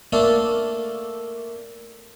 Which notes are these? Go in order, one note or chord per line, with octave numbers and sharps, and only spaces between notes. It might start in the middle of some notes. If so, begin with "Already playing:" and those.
A3 A#3 D4 A4